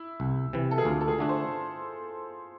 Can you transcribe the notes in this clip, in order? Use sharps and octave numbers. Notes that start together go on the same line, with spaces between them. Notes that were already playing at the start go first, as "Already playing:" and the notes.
Already playing: E4
C2
C3 E3
A4
G#4
D2 F4
A4
G#4
D3 A3 D4
C5